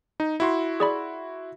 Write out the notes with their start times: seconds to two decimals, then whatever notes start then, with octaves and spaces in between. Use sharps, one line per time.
0.20 D#4
0.40 E4 F#4 C6
0.80 G#4 D5 B5